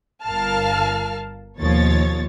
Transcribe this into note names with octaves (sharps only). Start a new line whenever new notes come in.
G1 A#4 F5 A5 F6
D#2 B2 F3 C#5 A6